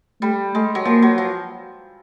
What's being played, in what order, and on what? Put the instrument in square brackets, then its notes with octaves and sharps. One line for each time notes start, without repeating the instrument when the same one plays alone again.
[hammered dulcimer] G3 [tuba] A3
[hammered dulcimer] G#3 [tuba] A3
[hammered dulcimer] F#3
[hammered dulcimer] F3 [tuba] A#3
[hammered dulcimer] F#3
F3